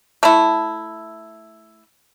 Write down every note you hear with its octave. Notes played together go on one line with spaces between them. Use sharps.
A3 E4